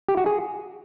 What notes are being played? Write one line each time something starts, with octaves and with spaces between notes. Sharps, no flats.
G4
F#4
G#4